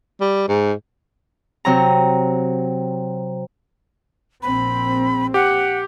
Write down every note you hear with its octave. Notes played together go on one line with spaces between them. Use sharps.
G3
G#2
C3 F#3 A#5
A#1 C4 B5
G4 F#5